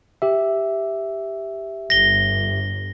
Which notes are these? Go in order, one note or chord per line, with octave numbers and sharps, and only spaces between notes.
G4 E5
G1 A#6 G7